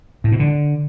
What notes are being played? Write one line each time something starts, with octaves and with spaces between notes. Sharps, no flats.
A2
B2
D3